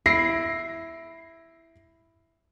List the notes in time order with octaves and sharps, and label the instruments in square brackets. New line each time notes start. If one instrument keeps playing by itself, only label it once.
[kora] E4 [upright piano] A#6 C7 D7